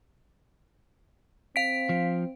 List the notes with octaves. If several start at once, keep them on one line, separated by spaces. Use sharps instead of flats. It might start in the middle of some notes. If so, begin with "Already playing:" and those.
C4 F5 B6 D7
F3